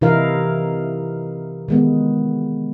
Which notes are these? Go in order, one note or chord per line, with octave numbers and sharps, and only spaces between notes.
C3 E3 D#4 E4 A#4 F5
D#3 G#3 B3